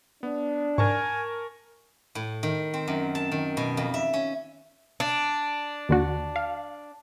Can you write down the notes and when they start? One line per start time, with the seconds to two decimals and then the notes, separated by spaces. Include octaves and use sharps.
0.23 B3 D4
0.78 G#2 A#4 G#5 A5 C#6
2.15 A2
2.43 D#3
2.74 C4
2.88 F#2
3.15 A5
3.31 D#3
3.57 B2
3.77 F2
3.94 E5
4.14 C#4
5.00 D4
5.89 D#2 D3 F#4
6.36 F5